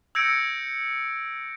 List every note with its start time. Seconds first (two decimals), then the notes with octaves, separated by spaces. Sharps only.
0.15 E6 G6 G#6 A#6 C#7 D7